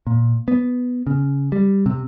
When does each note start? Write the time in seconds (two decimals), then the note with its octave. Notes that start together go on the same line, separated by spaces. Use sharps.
0.07 A#2
0.48 B3
1.07 C#3
1.52 G3
1.86 C3